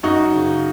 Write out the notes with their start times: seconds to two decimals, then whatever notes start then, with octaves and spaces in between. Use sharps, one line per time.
0.03 F#2 D#4 F#4
0.33 C#3